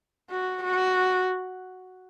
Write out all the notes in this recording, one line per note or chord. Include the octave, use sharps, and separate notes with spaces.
F#4
F#4